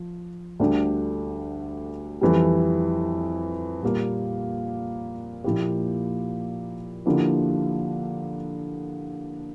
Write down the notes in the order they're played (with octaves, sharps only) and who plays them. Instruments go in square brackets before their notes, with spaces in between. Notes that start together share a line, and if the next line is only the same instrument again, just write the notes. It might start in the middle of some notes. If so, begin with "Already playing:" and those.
Already playing: [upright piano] F3
D2 D3 G3 D4 G4
F2 E3 G3
A#2 G3 A#3
A#2 F3 A#3 E4 G4
D3 F3 A#3 E4 G4